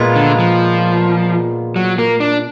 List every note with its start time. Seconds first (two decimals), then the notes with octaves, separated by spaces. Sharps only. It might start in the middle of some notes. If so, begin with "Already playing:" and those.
Already playing: A#2 G#3 B3 F4
0.16 D3
0.39 F3
1.76 F#3
1.99 A#3
2.20 D4